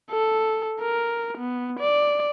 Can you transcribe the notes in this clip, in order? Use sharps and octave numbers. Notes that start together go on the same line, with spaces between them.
A4
A#4
B3
D5